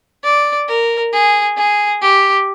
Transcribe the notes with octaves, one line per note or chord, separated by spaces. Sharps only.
D5
A#4
G#4
G#4
G4